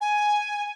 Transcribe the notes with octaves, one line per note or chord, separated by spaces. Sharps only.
G#5